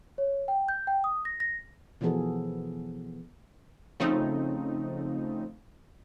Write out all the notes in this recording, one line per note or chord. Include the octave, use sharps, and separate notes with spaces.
C#5
G5
G6
G5
D#6
A#6
A#6
B2 E3 F3 B3 G#4 A4
C#3 F3 A3 C4 D#4